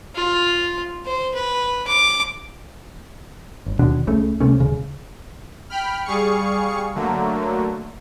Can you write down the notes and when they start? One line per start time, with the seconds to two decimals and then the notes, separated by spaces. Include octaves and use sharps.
0.15 F4
1.06 C5
1.35 B4
1.88 D6
3.66 G1
3.79 D#2 B2 D3 D4
4.07 C#2 C#3 A3
4.40 C2 C3 A3 C#4
4.60 D#1 C#3
5.69 G5 B5 F6
6.05 G3 G#4 F5 C#6 C#7
6.95 D3 F#3 A3 A#3